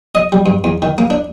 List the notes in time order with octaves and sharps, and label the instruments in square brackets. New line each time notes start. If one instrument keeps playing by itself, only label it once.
[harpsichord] D#5
G3
G2
E2
D#3
A#3
D4